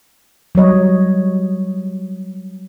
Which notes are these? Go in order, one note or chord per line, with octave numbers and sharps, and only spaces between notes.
F#3 G3 C#5 D#5